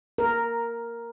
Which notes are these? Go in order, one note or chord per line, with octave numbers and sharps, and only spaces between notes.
A#4